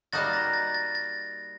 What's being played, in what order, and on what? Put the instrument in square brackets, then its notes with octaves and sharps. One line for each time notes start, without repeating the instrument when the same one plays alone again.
[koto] G3 A#3 D#4 F#4 [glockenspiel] A6
[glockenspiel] A#6
A6
A6
A6